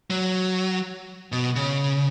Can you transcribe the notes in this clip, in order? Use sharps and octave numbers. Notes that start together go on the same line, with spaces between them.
F#3
B2
C#3